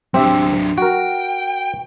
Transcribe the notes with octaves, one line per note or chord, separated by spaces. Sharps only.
F#3 C4 D4 G4 E5
F#4 A#4 G5